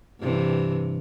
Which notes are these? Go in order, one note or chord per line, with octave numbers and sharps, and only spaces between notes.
G2 C3 E3